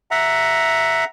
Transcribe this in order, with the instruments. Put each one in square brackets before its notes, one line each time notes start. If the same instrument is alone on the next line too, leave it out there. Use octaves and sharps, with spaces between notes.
[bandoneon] E5 F#5 A#5